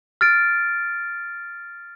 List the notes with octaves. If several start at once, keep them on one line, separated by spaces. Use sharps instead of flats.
F6 A6 D7